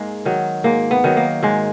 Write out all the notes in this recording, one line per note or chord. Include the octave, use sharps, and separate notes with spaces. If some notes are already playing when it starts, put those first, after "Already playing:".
Already playing: G#2 G#3 A#3
D#3 F#3
G#2 A#3
B3
D#3 F#3
A#3
G#2 G#3